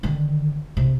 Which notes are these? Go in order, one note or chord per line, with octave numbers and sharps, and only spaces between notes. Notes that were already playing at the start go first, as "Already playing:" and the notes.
D3 D#3
C3